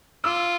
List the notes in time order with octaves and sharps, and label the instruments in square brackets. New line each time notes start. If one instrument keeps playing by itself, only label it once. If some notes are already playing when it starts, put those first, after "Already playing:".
[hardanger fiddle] F4 [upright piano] D6 E6